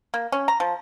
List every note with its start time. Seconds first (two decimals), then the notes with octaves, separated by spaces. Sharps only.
0.14 A#3
0.32 C#4
0.48 A#5
0.60 F3